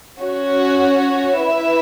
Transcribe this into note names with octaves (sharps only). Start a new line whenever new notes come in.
C#4 F#4 C#5
E4 B4 E5